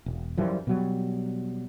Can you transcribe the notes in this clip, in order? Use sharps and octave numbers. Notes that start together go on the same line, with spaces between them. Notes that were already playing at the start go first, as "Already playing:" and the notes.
E1
F#2 E3 F3 G3
B2 F#3 G3